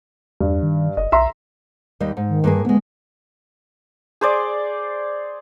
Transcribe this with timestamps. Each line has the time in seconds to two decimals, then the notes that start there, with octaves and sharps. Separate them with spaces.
0.40 E2 G2
0.63 D#3
0.97 F#1 D#5
1.12 B1 E5 A#5 C6
2.00 D#2 G3 D#5
2.17 G#2
2.29 D#3
2.44 G2 A#3 G#4
2.65 D2 G#3 B3
4.21 G#4 C5 D5